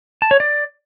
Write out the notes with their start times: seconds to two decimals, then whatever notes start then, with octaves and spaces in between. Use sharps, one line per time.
0.22 A5
0.31 C#5
0.40 D5